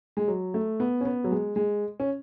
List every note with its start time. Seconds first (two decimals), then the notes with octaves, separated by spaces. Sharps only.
0.17 G#3
0.28 F#3
0.54 A3
0.80 B3
1.01 C#4
1.05 B3
1.24 F#3
1.31 G#3
1.56 G#3
2.00 C#4